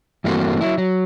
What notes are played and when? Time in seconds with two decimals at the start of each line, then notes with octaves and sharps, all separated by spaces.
0.24 G2 E3 A3 A#3 C4 F#4
0.61 F#3 E4
0.78 F#3